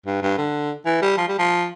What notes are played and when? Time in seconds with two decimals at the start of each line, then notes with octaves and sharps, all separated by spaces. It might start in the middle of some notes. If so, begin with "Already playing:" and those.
0.06 G2
0.22 G2
0.38 D3
0.86 E3
1.02 G3
1.17 F3
1.28 G3
1.39 F3